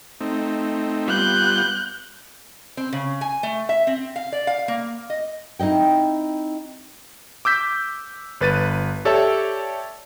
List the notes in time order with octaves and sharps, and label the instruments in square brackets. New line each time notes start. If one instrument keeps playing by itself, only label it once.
[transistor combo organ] A3 C4 D#4
[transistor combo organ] G3 B3 F4 [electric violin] F#6 G6
[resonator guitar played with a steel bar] C4
C#3
G#5
A3
E5
C4
F5
D5
F5
A#3
D#5
[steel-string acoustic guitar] C4 D#4 E4 D#5 G5
[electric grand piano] D6 E6 G6 B6
G1 B4 A6 D#7
G4 A4 C#5 D5 E5 A5